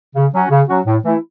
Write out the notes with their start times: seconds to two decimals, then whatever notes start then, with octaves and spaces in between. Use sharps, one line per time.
0.15 C#3
0.33 F#3 C#4 F#4
0.51 C#3
0.68 F#3 C#4 F#4
0.86 A2
1.04 E3 A3 E4